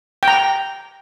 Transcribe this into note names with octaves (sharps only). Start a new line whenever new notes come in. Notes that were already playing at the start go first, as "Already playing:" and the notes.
G5
A#5
G5